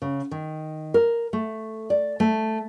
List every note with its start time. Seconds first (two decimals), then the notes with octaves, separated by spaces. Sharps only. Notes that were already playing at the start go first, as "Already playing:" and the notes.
0.02 C#3
0.31 D#3
0.94 A#4
1.33 A3
1.90 D5
2.20 A3